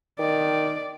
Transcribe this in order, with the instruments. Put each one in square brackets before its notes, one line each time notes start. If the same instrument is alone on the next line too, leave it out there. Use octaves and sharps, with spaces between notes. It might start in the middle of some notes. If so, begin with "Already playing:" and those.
[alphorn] D#3 [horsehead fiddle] D5